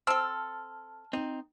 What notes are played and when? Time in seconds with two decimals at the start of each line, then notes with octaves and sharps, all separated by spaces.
0.07 C4 A4 A5 F6
1.13 C4 D#4